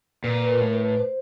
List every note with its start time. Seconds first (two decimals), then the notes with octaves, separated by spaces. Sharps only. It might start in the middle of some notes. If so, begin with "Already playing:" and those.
0.24 A#2 B4
0.38 B4
0.49 A#4
0.60 A2
0.73 B4
0.97 C5